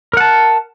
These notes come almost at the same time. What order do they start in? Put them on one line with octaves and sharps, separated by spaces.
A#4 F#5 A5